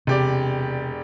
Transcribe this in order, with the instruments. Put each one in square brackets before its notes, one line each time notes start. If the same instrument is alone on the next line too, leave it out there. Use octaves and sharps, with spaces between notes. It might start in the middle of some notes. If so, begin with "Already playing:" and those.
[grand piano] E1 G4 D5 [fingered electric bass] C3